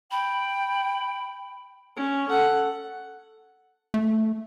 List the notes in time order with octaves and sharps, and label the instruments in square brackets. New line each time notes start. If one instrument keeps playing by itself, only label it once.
[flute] G5 [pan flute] B5
[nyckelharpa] C#4
A4 F#5
[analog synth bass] A3